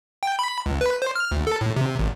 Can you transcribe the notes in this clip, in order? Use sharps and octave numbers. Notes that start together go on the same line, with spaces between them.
G5
B5
C#2
B4
C5
F6
D2
A4
A2
C3
G#1